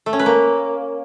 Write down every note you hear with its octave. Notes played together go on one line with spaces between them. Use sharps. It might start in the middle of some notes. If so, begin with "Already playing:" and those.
A3
C#4
B4
A#3